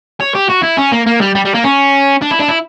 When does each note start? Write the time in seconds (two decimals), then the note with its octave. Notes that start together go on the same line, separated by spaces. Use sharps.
0.21 C#5
0.35 G4
0.50 F#4
0.64 E4
0.78 C#4
0.92 A#3
1.07 A#3
1.21 G3
1.35 G3
1.45 G3
1.54 A#3
1.64 C#4
2.22 D4
2.31 E4
2.40 D4
2.49 E4